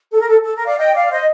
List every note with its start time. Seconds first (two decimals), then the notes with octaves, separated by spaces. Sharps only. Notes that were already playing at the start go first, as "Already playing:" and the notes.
0.12 A4
0.20 A#4
0.28 A4
0.44 A4
0.56 A#4
0.66 D5 F5
0.77 D#5 G5
0.94 D5 F5
1.10 C5 D#5